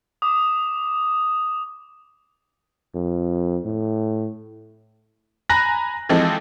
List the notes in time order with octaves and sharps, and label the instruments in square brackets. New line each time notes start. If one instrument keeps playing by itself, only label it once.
[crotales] D6 D#6
[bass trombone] F2
A2
[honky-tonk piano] G#5 A#5 B5 F#6 A#6
E3 F3 G#3 C4 D#4 A4